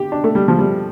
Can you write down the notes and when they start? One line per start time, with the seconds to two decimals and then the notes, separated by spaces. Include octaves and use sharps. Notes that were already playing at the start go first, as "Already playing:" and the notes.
Already playing: D3 G4
0.12 D4
0.24 A3
0.35 G3
0.48 F3
0.59 G3